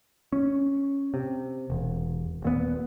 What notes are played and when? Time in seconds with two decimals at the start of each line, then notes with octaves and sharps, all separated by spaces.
0.33 C#4
1.14 C3
1.70 E1
2.42 D#1 A#2 B3